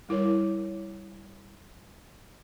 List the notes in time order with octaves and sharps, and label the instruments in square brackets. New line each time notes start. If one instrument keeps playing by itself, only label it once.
[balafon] G3 E4 A#4 C#5